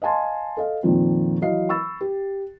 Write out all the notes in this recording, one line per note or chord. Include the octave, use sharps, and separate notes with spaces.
D#5 F5 G#5 A5 C6
A4 D#5 F5
F2 A#2 D#3 F3 C4
E3 F#3 D#5 F5 C7
B5 C#6 E6 A6
G4